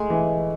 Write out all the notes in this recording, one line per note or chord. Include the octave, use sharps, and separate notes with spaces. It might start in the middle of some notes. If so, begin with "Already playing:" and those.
Already playing: G#3 A3
E3